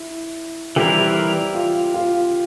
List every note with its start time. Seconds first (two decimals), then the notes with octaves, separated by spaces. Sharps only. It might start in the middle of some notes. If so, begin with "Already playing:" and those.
Already playing: E4
0.76 E3 G3 C4 E4 G4 A#4
1.55 F4
1.94 F4